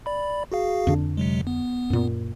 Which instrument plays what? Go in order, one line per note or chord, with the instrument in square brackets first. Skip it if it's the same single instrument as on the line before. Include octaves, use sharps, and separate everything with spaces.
[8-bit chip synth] D5 B5
F#4 G#4 F5
[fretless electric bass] F2 D3 D4
[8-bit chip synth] C3 F#3 G#3
B3
[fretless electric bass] F#2 A#2